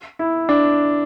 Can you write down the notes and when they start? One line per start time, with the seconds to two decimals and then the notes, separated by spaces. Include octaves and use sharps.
0.19 E4
0.49 D4